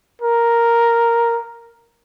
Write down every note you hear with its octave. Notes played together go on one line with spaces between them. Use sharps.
A#4